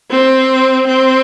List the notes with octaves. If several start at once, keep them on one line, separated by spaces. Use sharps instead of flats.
C4
C4